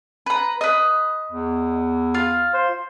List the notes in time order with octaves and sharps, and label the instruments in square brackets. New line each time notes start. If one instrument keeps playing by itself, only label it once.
[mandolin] B4 A#5
B4 D#5
[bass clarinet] E2
[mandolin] F4 F5
[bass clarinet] C5